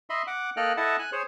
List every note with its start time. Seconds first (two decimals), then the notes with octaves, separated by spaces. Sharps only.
0.10 D#5 E5 B5 C6
0.27 F#5 D6
0.57 A#3 A4 D#5 G5 F6 F#6
0.77 E4 A4 D#5 E5 F#5 A5
0.99 G#5 F#6
1.12 G#4 C5 C#5